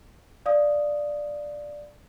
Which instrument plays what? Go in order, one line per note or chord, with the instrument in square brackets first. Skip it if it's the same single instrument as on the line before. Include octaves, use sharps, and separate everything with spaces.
[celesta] D5 F5 D#6